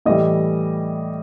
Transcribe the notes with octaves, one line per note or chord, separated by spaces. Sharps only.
A2 E3 G3 D#5